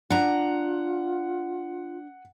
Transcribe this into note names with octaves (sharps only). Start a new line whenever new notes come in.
D4 F4 F#5 A#5